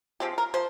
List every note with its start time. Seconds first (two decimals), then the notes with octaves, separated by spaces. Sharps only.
0.20 F3 G#3 C4 G4
0.38 A#4
0.54 F3 C5